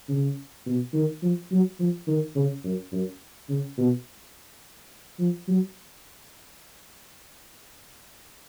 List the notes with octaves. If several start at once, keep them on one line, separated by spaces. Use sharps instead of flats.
C#3
B2
D#3
F3
F#3
F3
D#3
C#3
F#2
F#2
C#3
B2
F3
F#3